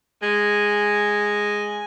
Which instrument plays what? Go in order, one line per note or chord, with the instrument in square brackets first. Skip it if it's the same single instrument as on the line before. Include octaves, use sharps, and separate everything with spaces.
[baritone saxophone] G#3 [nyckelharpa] G#5